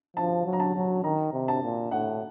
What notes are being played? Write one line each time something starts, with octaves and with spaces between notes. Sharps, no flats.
F3 A5
F#3
A#5
A5
F#3
D#3 A#5
C3
A5
A#2
A2 F#5